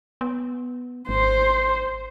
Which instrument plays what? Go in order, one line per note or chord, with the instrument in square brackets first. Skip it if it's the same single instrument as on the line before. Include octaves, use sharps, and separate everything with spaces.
[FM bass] B3
[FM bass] G#1 [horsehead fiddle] C5